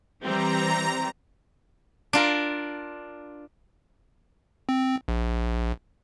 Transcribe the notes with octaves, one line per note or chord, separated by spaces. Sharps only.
E3 G3 C4 A#5
D4 F4 A#4
C4
A#1